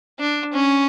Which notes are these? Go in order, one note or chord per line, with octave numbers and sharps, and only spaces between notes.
D4
C#4